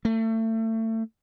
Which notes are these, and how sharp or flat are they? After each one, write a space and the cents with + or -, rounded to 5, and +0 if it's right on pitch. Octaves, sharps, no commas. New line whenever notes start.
A3 +30